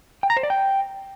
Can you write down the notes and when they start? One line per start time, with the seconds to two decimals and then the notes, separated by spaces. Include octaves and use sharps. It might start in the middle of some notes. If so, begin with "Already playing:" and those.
0.23 G5
0.30 A#5
0.37 C5
0.43 D5
0.50 G5